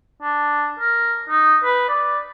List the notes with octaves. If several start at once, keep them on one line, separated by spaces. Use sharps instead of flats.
D4
A#4
D#4
B4
D5